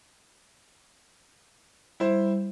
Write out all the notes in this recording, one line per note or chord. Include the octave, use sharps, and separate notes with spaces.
G3 E4 C5